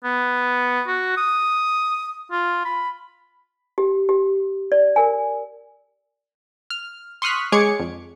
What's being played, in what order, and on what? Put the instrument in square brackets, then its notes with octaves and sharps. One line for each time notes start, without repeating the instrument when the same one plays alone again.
[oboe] B3
F#4
D#6
F4
B5
[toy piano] G4
G4
D5
A#4 G#5
[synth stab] F6
C6 C#6 D#6 F6 F#6 B6
G#3 G#4 C#5 D6 G#6 C#7
F2